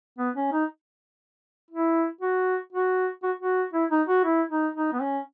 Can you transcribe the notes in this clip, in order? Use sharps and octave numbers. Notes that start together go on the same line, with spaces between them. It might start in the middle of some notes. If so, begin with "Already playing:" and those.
B3
C#4
D#4
E4
F#4
F#4
F#4
F#4
E4
D#4
F#4
E4
D#4
D#4
B3
C#4